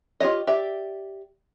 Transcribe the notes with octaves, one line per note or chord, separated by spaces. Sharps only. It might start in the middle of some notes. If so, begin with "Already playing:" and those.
F4 G4 C#5 D#5
G4 D5 E5